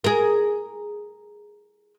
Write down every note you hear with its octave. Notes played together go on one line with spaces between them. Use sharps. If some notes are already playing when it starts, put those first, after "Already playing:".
G#4 A#4